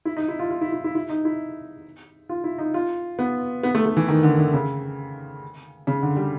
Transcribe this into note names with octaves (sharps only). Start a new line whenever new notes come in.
E4
D#4
E4
F4
F4
E4
E4
E4
E4
D#4
E4
F4
E4
D#4
F4
B3
B3
A3
A3
E3
D#3
D3
D3
C#3
C#3
D3
G3